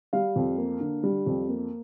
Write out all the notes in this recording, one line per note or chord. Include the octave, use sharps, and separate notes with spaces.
G3 F5
F2
A#3
D3
G3
F2
A#3